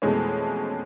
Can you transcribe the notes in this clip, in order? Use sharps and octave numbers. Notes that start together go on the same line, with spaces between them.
F2 B2 E3 G#3 A3 C#4